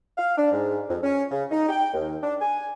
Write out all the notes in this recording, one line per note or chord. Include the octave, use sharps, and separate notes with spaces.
F5
D4
G#2
F2
C#4
C#3
D#4
G5
D#2
D4
G#5